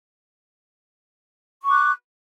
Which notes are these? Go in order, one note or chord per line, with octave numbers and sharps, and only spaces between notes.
C#6 D6 F#6